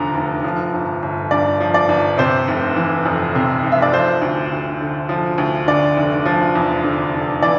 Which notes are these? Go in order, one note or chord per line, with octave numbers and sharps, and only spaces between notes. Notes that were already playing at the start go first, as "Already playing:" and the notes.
Already playing: F1 E2 D3 F3 A#5
F1
F3
G1
G1
G2 D5
F3
D5
G1
C3 C5
F1
E3
F2
C3
F1
E5
D5
F3 C5
D2
D2
D3
F3
D2
D3 D5
F1
F3
E2
D3
F1
E3 D5